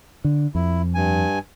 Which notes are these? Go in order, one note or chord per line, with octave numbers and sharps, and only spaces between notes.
D3
F2 E4
G2 G#5